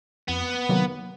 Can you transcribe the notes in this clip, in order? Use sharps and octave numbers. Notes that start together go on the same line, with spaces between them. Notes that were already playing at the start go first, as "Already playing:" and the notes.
F2 B3
C3 D#3 F#3 A#3